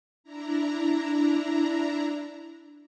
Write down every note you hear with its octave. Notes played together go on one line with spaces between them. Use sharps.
D4 E4 A#5